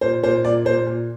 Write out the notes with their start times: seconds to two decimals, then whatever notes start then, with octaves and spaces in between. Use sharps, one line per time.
0.01 A#2 C5
0.23 A#2 C5
0.45 A#2 D5
0.65 A#2 C5
0.86 A#2